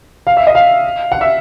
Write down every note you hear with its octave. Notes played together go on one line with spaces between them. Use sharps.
F5
E5
D#5
F5
F#5
E5